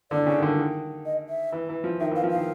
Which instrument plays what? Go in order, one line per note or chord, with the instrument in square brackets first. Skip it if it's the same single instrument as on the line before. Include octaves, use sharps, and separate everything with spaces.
[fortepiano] D3 [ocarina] D5
[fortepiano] C#3
D#3
D3
D#3
[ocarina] D#5
E5
[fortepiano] E3
E3
F3
[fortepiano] D#3 [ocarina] E5
[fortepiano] E3 [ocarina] F5
[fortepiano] F3
[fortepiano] D#3 [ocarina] F5